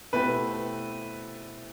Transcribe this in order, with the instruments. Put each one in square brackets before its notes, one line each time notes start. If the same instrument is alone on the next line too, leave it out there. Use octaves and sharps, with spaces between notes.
[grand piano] B2 A3 C4 E4 G4 [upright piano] B4